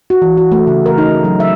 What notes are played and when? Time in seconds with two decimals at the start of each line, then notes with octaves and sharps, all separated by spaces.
0.10 F#4
0.22 E3
0.37 F#4
0.52 A3
0.67 C#3
0.86 A#4
0.98 D#4
1.24 F#3
1.40 E5